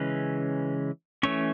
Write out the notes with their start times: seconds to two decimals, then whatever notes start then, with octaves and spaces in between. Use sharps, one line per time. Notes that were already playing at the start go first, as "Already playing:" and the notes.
Already playing: C#3 E3 G#3 C#4 B4 B5
1.23 E3 A3 C#4 C#5 C#6